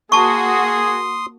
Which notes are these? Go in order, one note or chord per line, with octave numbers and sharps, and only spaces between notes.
A#3 F#4 G#4 A5 C6 C#6 D#6